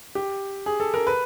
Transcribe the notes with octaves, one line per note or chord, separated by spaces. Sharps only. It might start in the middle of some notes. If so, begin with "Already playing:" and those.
G4
G#4
A4
A#4
B4